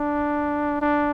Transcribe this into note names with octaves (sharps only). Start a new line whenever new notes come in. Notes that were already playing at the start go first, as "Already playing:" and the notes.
Already playing: D4
D4